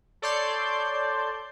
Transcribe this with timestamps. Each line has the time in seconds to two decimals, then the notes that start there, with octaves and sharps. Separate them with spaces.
0.22 A4 C#5 D5 A5 C6 G6